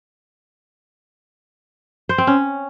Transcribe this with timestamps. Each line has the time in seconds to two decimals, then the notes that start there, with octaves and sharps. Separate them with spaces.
2.09 C5
2.18 C4
2.27 C#4